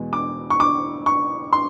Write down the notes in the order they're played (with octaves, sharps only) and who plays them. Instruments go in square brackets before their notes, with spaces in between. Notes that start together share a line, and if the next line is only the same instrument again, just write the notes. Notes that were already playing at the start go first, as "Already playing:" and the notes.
Already playing: [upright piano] E2 B2 G#3
D6
C#6
D6
C#6
C6